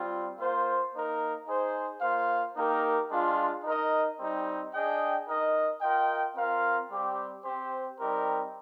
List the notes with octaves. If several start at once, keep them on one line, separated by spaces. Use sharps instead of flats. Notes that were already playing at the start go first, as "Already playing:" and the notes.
Already playing: G3 C4 F4
A#3 F4 C5 F5
A#3 D#4 A#4
D#4 G#4 C5
A#3 F4 C5 F5
A#3 D#4 G4 A#4
G#3 D4 F4
D#4 A#4 D#5
G3 C4 D#4
D4 G#4 D#5 G5
D#4 A#4 D#5
F4 A#4 D#5 G5
C4 F4 A#4 F5
G3 C4 G4
C4 G4 C5
G3 C4 D#4 G4 A#4